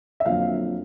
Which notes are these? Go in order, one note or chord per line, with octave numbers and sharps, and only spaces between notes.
E5
F2 D3 F#3 A#3 F5